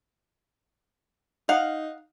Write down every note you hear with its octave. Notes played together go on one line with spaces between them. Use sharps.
D#4 F5 F#5